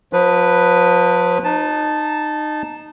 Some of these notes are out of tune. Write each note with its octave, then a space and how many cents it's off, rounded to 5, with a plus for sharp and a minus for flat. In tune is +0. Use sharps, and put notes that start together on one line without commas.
F3 +35 B4 +0
D#4 -25 A5 +0